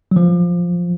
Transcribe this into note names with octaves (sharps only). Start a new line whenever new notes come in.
F#3
F3